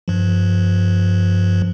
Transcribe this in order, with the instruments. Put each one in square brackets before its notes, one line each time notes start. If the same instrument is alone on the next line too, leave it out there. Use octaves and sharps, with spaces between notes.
[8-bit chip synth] G2 F3